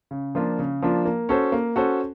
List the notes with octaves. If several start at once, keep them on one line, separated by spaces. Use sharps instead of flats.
C#3
F3 A#3 D4 F4
C#3
F3 A#3 D4 F4
A#3
C#4 F#4 A4 C5
A#3
C#4 F#4 A4 C5